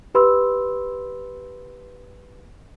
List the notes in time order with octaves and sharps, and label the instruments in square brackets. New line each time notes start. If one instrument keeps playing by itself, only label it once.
[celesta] G4 B4 B5 C6 E6